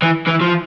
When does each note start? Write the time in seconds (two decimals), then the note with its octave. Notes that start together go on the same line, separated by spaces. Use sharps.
0.02 E3
0.27 E3
0.42 F3